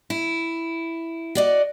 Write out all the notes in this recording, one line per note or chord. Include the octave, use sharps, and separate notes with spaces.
E4
F#4 D5 D#5